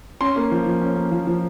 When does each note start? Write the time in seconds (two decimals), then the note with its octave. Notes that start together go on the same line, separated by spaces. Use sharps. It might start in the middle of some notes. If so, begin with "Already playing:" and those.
0.21 C#4 C6
0.36 A#3
0.51 F3
0.65 F3
0.81 C#4
0.96 A#3
1.12 F3
1.27 F3